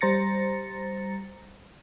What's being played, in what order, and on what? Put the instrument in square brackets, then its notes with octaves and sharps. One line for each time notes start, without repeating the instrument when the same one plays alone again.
[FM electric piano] G3 C5 A#5 A6 A#6 C#7